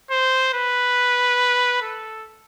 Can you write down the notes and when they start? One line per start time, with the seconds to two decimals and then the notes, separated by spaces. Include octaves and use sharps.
0.11 C5
0.54 B4
1.82 A4